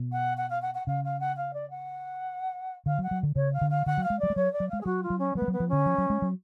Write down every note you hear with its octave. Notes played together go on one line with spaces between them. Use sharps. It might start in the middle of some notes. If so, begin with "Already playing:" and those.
Already playing: B2
F#5
F#5
F5
F#5
F#5
C#3 F5
F5
F#5
F5
D5
F#5
D3 F5
F#3
F#5
F#3
D3
C#3 C#5
F5
D3
F5
D3 F#5
F#3
F5
G#3
F#3 D5
G#3
F#3 C#5
D5
F#3
G#3 F5
G#4
F#3 F#4
F4
F#3
C#4
F#3 B3
G#3
F#3 B3
F3
D3 C#4
F3
F#3
G#3
F#3